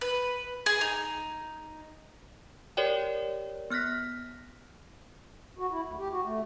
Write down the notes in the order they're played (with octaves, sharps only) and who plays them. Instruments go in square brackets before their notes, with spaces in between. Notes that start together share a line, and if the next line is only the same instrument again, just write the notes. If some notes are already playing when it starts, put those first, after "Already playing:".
[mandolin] B4
G#4
D#4
[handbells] G4 A#4 C#5 D5 G5
B3 F6 F#6 A#6 B6
[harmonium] F#4
E4
D2
G4
F#4
A3